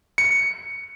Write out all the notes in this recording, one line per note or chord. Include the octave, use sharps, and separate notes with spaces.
C#7